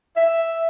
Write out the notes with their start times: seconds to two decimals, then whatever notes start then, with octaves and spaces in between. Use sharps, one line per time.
0.16 E5